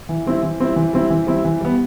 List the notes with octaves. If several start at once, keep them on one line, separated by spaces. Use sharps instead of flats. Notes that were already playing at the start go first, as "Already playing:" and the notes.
E3
G3 C4 E4
E3
G3 C4 E4
E3
G3 C4 E4
E3
G3 C4 E4
E3
G3 B3